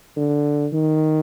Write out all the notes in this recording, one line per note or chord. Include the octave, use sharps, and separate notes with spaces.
D3
D#3